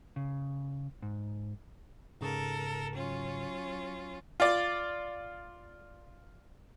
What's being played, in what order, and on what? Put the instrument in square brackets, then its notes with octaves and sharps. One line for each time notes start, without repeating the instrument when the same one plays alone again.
[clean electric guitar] C#3
G#2
[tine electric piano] G#2 C#3 [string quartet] A4 A#4
[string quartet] F#3 C#4 F4
[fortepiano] F4 D5